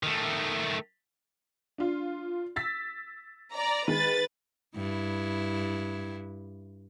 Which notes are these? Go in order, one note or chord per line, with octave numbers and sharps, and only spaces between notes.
D#3 A3
D4 F4
E6 A6 B6
D5 A#5
D#3 G#3 B4 A6
G2 E4